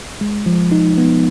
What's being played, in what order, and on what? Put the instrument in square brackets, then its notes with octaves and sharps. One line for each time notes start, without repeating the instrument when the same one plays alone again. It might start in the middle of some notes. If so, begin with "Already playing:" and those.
[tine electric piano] G#3
F3
D#4
B3